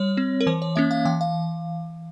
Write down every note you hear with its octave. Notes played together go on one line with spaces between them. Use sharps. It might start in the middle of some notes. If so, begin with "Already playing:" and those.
Already playing: G3 C#5
C4
A#4
E3 C5
C#5
A#3 C#4 E5
F5
E3 G5
F5